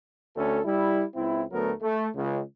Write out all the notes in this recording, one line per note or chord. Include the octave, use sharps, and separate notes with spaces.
D2 A3 C#4 A4
G3 E4
C#2 C4 E4
D2 F#3 A3 B3 A#4
A3
C#2